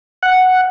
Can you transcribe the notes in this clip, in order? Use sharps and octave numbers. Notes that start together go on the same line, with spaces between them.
F#5